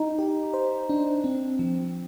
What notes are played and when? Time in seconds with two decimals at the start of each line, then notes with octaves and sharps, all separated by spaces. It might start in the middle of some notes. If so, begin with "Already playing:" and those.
Already playing: D#4
0.19 G4
0.54 C5
0.89 D4
1.24 C4
1.59 F3